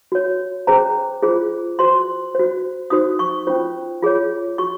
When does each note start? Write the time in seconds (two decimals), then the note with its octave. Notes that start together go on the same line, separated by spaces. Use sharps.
0.12 F#4 C#5
0.67 C#4 G#4 C5 A#5
1.23 F4 G#4 C5
1.79 F#4 C5 C6
2.35 F#4 C5
2.90 D#4 F#4 C5 D#6
3.19 C#6
3.47 C#4 F4 C5
4.02 F4 G#4 C#5
4.58 F#4 C#6